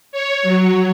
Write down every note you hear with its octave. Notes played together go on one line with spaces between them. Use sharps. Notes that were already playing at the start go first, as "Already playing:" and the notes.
C#5
F#3